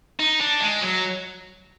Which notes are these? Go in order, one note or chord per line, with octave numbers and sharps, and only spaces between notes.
D#4
D4
G#3
F#3